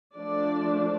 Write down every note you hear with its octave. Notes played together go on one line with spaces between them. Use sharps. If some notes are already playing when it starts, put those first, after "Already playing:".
F3 A3 D4 D5